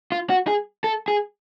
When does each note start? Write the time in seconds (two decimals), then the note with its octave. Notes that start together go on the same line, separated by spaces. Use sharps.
0.12 F4
0.30 F#4
0.47 G#4
0.84 A4
1.08 G#4